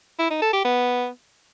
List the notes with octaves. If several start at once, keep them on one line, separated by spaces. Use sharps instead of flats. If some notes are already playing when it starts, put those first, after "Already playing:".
E4
D#4
A4
G4
B3